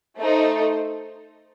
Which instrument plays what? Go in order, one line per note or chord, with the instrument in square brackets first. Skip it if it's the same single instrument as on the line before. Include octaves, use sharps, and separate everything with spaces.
[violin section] A3 D#4 A4 C5